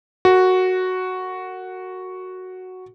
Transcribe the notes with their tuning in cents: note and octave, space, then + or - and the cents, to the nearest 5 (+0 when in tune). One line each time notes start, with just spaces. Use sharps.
F#4 +0 A#4 -35